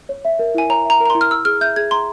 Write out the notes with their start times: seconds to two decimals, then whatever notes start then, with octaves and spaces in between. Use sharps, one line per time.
0.09 C#5
0.25 E5
0.39 A#4
0.55 E4 G#5
0.69 C#5 A#5
0.85 E5 A#5
1.00 A#4
1.06 A#5
1.10 E4 C6
1.21 F6
1.31 A#5 E6
1.45 G#4 F6
1.61 E5 G6
1.76 G#4 G#6
1.91 A#5 C6